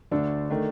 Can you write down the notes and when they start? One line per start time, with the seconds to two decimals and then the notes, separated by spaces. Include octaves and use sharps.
0.11 D2 D3 A3 D4 A4
0.50 D#3 A3 D4